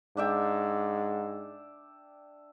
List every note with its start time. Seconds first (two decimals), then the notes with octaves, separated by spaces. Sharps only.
0.17 G#2 D4 E5 G5